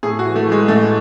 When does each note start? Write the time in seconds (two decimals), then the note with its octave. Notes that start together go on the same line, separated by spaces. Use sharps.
0.03 A2 G#4
0.19 F#4
0.25 E3
0.36 A3
0.47 E3 G#3
0.68 A1 A3